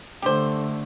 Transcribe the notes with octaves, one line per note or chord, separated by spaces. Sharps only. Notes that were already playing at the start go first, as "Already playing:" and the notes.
D3 A3 G4 C5